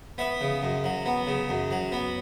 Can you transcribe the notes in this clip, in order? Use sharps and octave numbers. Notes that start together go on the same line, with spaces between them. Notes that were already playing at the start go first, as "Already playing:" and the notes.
B3 E5
C#3
F#2
F#3
B3
C#3
F#2
F#3
B3